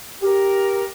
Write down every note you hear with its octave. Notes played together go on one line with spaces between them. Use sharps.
G4 A#4